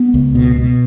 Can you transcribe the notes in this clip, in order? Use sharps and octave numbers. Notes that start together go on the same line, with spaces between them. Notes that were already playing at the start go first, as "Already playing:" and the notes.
Already playing: B3
C#2
B2
B2